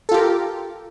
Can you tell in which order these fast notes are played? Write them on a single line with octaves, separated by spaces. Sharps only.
A4 F4 G4 A#4